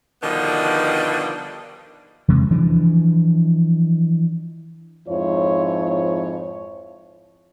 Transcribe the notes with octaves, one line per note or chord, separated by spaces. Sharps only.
B2 D3 D#3 F3 G3 B3
E2 C3 G#3
E3 F3 G#3 D4
F2 G#2 F3 E4 C#5